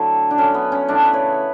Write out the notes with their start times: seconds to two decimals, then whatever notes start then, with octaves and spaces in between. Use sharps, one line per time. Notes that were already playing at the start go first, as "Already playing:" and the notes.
Already playing: D3 F#3 A3 E4
0.31 D4
0.38 D3 F#3 A3 C#4
0.54 B3
0.72 C#4
0.88 C#3 E3 A3 D4
1.05 B4
1.13 C#5